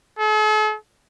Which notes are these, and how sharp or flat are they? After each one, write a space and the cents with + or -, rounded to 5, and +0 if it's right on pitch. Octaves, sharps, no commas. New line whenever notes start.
A4 -45